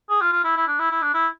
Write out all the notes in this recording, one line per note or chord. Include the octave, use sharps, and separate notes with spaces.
G#4
F4
F4
E4
E4
D4
E4
E4
D4
E4